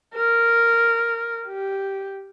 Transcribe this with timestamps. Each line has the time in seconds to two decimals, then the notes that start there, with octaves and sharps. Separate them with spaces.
0.15 A#4
1.47 G4